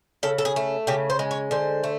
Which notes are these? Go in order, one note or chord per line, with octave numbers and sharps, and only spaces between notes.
C#3 A4
A4
G#4
A3
C#3 G4
C5
G#3
C#5
D3 C5
A3